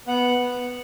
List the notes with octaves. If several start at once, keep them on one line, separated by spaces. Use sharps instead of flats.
B3 F#5
B3